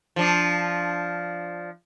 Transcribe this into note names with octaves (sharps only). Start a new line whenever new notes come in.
F3 D4